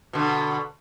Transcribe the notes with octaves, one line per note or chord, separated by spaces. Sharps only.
B2 D3